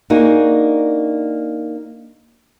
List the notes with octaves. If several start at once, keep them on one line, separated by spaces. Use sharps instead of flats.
A#3 D4 D#4 F#4 G#4